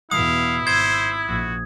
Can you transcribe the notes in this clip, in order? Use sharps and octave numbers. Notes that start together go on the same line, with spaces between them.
E2 B2 E4 F5 D#6
G#1 C5 G#6
A#1 F#4